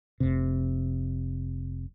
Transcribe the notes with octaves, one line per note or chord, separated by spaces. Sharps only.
F1 C3